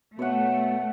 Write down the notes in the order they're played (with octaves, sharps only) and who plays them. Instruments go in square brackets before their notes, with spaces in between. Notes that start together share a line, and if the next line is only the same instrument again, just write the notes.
[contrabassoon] B2 [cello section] A3 [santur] C#5 F#5